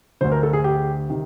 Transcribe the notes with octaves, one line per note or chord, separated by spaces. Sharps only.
D2 D3 C5
A#4
A4
G#4
G4
C3 D#3